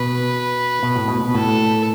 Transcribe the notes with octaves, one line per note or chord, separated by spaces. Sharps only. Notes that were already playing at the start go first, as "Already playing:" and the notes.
Already playing: B2 B4
B2
A2
B2
B2
A2 A4